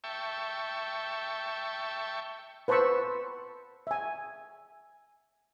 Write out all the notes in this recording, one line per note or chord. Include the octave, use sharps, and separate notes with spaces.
E5 G5 A5 C#6
B4 C5 A5 B5 C#6 E6
E5 G#5